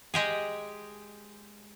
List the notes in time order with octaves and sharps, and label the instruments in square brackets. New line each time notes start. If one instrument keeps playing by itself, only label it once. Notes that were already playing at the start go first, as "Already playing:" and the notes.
[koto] G#3 G4 G#4